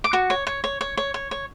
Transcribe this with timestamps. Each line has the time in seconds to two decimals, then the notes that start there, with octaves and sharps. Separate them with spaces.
0.04 D6
0.13 F#4 C#6
0.30 C#5
0.47 C#5
0.64 C#5
0.81 C#5
0.97 C#5
1.14 C#5
1.31 C#5